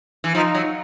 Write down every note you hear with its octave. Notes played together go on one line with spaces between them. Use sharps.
E3
F3 D#4
F#3